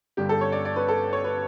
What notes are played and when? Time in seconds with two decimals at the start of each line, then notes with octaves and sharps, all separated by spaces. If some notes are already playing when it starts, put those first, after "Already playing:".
0.17 G1 G2 D3 G3 G4
0.29 A4
0.41 C#5
0.52 D5
0.65 D5
0.76 B4
0.88 A4
1.13 C#5
1.24 B4